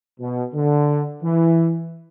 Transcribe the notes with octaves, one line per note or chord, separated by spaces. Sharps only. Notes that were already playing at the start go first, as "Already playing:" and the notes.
B2
D3
E3